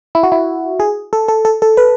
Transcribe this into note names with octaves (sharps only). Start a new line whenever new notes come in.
E4
F#4
E4
G#4
A4
A4
A4
A4
B4